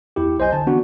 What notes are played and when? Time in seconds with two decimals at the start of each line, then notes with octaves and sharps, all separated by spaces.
0.16 E2 E4 G4
0.38 B1 C5 D#5 G#5 G6
0.53 D3 A5
0.67 E3 B3 D4 F#4